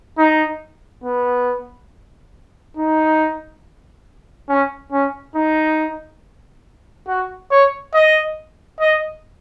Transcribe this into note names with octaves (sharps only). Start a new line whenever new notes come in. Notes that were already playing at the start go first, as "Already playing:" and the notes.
D#4
B3
D#4
C#4
C#4
D#4
F#4
C#5
D#5
D#5